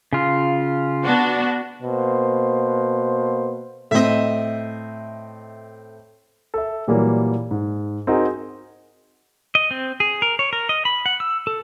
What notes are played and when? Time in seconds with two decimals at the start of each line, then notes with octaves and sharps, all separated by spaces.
0.13 C#3 F4
1.04 B3 D4 F#4
1.82 B2 A#3 C5
3.91 A2 C4 D#5 E5
6.54 A4 E5
6.88 A#2 E3 F#3 G3 A#3
7.51 G#2
8.07 C4 D#4 F#4 G#4 A#4
9.55 D#5
9.71 C4
10.00 G#4
10.22 A#4
10.39 C#5
10.53 A#4
10.69 D#5
10.85 B5
11.06 F#5
11.20 E6
11.47 A4